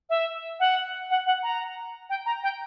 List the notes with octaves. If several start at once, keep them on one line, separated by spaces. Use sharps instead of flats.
E5
F#5
F#5
F#5
A#5
G5
A#5
G5